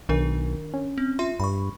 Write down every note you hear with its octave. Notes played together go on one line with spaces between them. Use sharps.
B1 D#3 D4 A#4
C#4
C4
F4 E5 C6
G2 B5 C#6